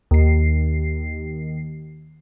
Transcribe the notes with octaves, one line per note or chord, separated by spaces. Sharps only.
D#2 C7